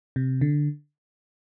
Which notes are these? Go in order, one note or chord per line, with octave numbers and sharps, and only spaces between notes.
C3
D3